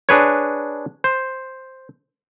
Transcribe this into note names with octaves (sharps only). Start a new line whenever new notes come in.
D4 G#4 B4 C#5
C5